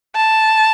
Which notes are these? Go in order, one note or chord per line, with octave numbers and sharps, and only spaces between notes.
A5